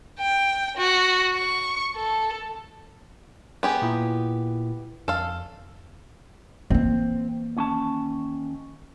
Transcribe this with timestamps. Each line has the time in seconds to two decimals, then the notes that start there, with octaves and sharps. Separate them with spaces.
0.19 G5
0.77 F#4
1.36 C#6
1.96 A4
3.63 B3 G4 G#4
3.82 A#2 E4
5.08 F2 A4 F5
6.70 E3 A#3 C4
7.57 D#2 C#4 A5